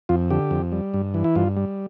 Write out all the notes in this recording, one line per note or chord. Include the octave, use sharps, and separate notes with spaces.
F2 F4
D3 G4
F2
G3
G2
E3
E4
G2 F4
G3